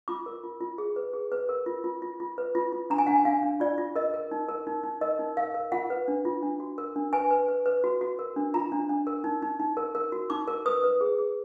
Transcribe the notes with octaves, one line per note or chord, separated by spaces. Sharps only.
F4 D6
A#4
F4
F4
G#4
B4
G#4
B4
A#4
F4
F4
F4
F4
B4
F4
F4
D4 A#5
G#5
D4 F#5
G#5
D4 F5
D4
F4 D5
F4
A#4 D#5
A#4
D#4
A#4
D#4
D#4
A#4 D#5
D#4
A#4 F5
A#4
F4 F#5
B4
D4
F4
D4
F#4
A#4
D4
B4 G#5
B4
B4
B4
F#4
F#4
A#4
D4
F4 A#5
D4
D4
A#4
D#4
D#4
D#4
A#4
A#4
F#4
D#4 D6
A#4
B4 D#6
B4
G#4
G#4